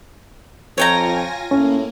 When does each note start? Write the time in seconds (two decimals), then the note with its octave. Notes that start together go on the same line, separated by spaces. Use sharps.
0.78 F2 F4 C#5 G5 G#5 A#5 A#6
1.51 A2 A#3 C#4